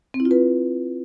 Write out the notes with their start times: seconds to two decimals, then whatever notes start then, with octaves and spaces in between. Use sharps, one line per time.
0.14 C4
0.20 E4
0.25 F4
0.31 B4